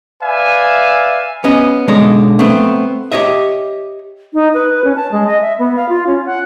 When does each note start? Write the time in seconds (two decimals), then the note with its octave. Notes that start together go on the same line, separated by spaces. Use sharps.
0.22 B4 D5 E5 F5 G#5
1.44 B3 C#4 D#5
1.88 B1 D3 G#3 D4 C#5 D#5
2.39 A3 B3 C4
3.12 G4 C#5 D#5 E5
4.34 D#4
4.54 B4
4.84 C#4
4.96 A5
5.12 G#3
5.27 D#5
5.41 E5
5.59 B3
5.76 F5
5.89 F4
6.07 C#4
6.26 F#5